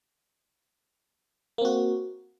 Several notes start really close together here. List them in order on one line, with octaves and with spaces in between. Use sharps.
A#3 C4 F#4